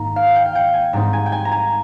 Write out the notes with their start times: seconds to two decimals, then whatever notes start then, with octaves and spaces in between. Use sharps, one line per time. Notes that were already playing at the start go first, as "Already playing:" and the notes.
Already playing: G#2 D#3 A#3 D#4 A#5
0.16 F5
0.36 G5
0.46 F5
0.55 G5
0.74 G#5
0.93 G#2 G3 C4 D#4 A#5
1.13 G#5
1.26 G5
1.32 G#5
1.45 A#5
1.52 G#5